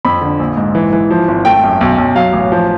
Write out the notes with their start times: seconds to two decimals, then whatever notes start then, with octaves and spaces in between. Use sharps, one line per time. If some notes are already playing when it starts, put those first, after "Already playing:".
0.05 F2 B5
0.21 D3
0.40 A#1
0.57 G#2
0.75 E3
0.93 E3
1.11 F3
1.28 G#1
1.45 A3 G5
1.64 F#2
1.81 B1
1.98 B1
2.15 F#3 F5
2.33 A1
2.52 F3